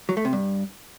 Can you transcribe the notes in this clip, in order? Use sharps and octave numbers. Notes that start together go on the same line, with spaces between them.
F#3
A3
C3
G2